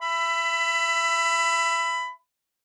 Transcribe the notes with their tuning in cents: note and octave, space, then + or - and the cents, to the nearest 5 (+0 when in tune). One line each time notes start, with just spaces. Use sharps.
E5 +25 B5 +15